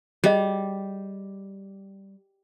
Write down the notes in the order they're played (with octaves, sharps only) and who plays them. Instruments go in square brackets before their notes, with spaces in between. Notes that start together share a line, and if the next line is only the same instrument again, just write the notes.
[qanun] G3 [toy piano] G#4 D#5